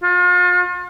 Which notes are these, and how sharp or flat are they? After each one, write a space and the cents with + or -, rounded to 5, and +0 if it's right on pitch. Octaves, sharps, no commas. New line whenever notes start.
F4 +40